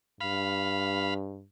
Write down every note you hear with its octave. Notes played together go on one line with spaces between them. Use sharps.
G2 F5 B5